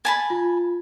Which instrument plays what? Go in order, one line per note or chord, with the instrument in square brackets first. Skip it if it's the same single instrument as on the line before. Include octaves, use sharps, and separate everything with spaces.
[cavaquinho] G#5 A5 B5
[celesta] F4